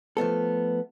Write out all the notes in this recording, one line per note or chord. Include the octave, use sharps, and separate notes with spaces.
F3 A3 B3 A4